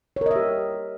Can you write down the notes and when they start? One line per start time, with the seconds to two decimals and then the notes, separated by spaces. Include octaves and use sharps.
0.16 C#5
0.21 A#4
0.26 D#5
0.31 E5
0.36 G4